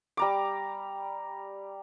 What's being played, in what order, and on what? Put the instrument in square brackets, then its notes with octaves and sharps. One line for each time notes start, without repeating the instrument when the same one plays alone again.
[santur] G3 A#5 D6